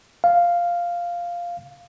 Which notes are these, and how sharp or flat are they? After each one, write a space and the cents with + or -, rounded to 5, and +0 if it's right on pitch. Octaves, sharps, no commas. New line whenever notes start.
F5 -5